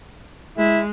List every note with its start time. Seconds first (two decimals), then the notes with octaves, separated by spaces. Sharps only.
0.58 G#3 E4